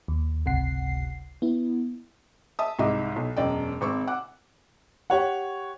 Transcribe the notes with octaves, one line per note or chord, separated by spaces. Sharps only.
D#2
G1 C#2 C3 F#5 C7
B3 E4
E5 A5 D#6
C2 G#2 D#5 E5 D6
B1
E1 F#2 D5 D#5 G5
G#1 C4 C#6 D6 E6
F#5 D6 F#6
G4 C#5 F#5